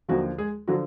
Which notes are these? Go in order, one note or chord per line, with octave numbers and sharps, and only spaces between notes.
D#2 D3 F3 F#3 F#4
G#3 G#4
D3 F3 F#3 F#4